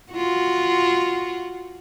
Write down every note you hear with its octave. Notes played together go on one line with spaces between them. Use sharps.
F4 F#4